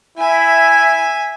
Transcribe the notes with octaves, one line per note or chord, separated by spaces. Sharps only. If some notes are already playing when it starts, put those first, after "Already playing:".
E4 E5 G#5